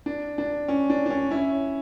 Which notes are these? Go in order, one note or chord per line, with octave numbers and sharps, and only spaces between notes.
D4
D4
C#4
D4
D4
C#4
C#4 E4